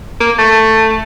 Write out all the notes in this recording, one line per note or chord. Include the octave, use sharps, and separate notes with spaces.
A#3
A3